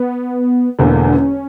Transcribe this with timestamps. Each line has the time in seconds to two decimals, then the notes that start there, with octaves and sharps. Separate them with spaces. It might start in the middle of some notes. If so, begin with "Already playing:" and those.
Already playing: B3
0.79 E1 E2 D3 A#3 C#4
0.91 D4
1.03 D4
1.15 C#4